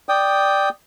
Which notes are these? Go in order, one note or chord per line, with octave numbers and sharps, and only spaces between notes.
D5 G5 D#6